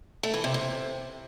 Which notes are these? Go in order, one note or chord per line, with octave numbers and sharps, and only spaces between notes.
A3
E3
C3
C3